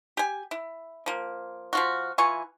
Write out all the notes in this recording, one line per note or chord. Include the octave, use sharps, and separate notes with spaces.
G4 G#5
E4
F3 A#3
F3 F4 F#4
E3 F4 G#5 C#6